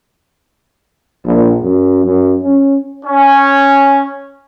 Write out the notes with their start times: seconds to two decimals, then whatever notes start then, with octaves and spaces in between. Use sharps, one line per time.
1.25 A#1
1.62 F#2
2.05 F#2
2.42 C#4
3.06 C#4